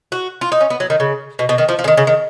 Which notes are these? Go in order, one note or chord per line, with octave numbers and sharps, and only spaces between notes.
F#4
F4
D#4
C#4
B3
F#3
D#3
C#3
B2
B2
D#3
F3
F3
C#3
D#3
C#3
D#3